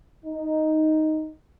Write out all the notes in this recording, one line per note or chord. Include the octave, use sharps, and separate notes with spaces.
D#4